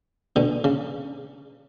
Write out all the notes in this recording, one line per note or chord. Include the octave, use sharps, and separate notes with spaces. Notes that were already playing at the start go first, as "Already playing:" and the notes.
B2 D3
C#3